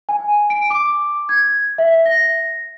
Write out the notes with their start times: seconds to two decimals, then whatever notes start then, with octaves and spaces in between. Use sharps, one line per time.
0.09 G#5
0.50 D7
0.70 D6
1.29 G#6
1.78 E5
2.06 A#6